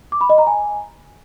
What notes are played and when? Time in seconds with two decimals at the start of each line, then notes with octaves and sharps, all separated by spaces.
0.12 D6
0.21 B5
0.30 D#5
0.38 A#5
0.47 G#5